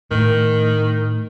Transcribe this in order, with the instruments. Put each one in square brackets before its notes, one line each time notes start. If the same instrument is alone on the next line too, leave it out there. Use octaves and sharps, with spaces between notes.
[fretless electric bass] A2 [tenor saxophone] D#3